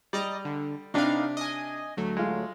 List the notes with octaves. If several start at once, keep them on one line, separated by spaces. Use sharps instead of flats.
G3 D5 D#5 A#5
D3
C3 D4 D#4 B4 F5
D#5 G#5
D2 F#3 A3
G#3 F4